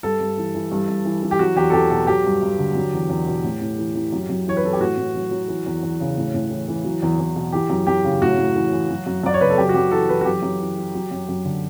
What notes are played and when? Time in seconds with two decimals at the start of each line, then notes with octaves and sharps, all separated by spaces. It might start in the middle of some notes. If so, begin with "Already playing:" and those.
0.03 G2 A4
0.20 G2
0.37 E3
0.55 E3
0.72 G2
0.88 G2
1.05 E3
1.23 E3
1.31 G4
1.39 F#3 F#4
1.56 E2 G4
1.70 A4
1.73 E2 G4
1.90 B2 A4
2.07 F#3 G4
2.24 G2
2.42 G2
2.59 D3
2.75 F#3
2.93 E2
3.10 E2
3.27 B2
3.44 A2
3.61 A2
3.78 E3
3.95 E3
4.12 F#2
4.29 F#2
4.47 E3 C#5
4.57 B4
4.63 E3 A4
4.73 G4
4.80 A2 F#4
4.97 A2
5.15 F#3
5.31 F#3
5.48 E3
5.66 E2
5.82 E2
6.00 C#3
6.17 A2
6.34 A2
6.50 E3
6.68 E3
6.84 F#3
7.02 E2
7.19 E2
7.36 B2
7.52 E3 G4
7.70 F#2
7.87 F#2 G4
8.04 C#3
8.22 A2 F#4
8.38 A2
8.56 E3
8.72 E3
8.90 F#3
9.06 F#2
9.23 F#2 D5
9.34 C#5
9.41 C#3 B4
9.50 A4
9.57 F#2 G4
9.69 F#4
9.74 F#2 G4
9.91 E3 A4
10.09 E3 B4
10.21 F#4
10.25 F#2 G4
10.42 F#2
10.60 E3
10.77 E3
10.94 F#3
11.11 F#2
11.28 F#2
11.45 D3